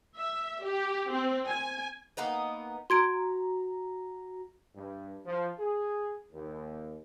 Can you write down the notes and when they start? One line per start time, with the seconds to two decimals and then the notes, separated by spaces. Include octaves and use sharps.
0.15 E5
0.62 G4
1.11 C4
1.46 G#5
2.17 A#3 B3 D#4 B4
2.90 F#4 A#5 C6 G#6 D7
4.76 G2
5.26 F3
5.59 G#4
6.33 D#2